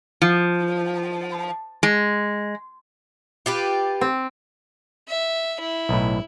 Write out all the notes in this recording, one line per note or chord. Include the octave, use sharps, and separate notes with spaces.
F3
G#3
F4 G4 B4
C4
E5
E4
B1 A2